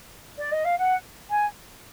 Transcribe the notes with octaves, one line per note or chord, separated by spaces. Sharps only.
D5
D#5
F5
F#5
G#5